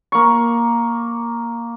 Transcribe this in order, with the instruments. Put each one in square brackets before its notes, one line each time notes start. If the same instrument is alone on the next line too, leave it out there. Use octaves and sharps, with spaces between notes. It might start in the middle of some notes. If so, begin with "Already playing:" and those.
[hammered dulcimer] A#3 C#6